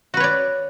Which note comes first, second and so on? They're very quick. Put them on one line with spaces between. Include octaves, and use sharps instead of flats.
F#4 B4 C#5 D5